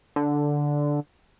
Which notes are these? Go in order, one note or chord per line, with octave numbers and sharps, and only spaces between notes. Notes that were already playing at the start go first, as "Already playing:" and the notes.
D3